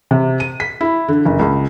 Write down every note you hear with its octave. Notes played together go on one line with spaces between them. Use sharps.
C3
D#7
B6
E4
D3
F#1
C#2